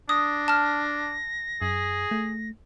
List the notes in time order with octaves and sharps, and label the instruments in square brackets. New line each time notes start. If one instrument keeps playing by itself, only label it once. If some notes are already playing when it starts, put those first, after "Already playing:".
[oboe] D4 [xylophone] D#6 [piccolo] A#6
[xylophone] A5 F6
[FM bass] F#2 [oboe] G#4
[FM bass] A3